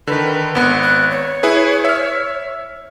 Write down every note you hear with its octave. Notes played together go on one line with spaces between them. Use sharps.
D3 D#3 B4
G#1 B3 F#5
F#6
C#5
E4 G#4 B4
E5 F6